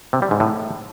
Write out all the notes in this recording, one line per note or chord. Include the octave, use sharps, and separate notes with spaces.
C3
G3
G#2
A2